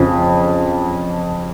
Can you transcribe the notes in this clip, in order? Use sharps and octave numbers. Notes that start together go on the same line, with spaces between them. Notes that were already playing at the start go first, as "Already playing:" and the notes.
Already playing: F2 C#3 F3